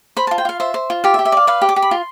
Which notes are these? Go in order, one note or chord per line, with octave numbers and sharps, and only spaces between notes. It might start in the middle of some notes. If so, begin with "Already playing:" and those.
C5 B5
A5
F4
G5
F4 F5
C5 E5
C5
F4
G4 F5
E5
G4
E5
D5 F5
B4 F5
G4
D6
G4
B5
F4 C6